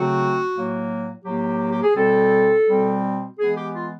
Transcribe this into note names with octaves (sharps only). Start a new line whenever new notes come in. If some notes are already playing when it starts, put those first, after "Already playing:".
Already playing: C#3 F#3 A3 C4 F#4
A2 F#3 A#3
A2 F#3 A#3 G4
G4
G#4
B2 G3 C4 A4
B2 G3 C4
E3 G#3 B3 G#4
G4
F4